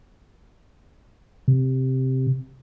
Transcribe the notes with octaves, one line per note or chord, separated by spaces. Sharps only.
C3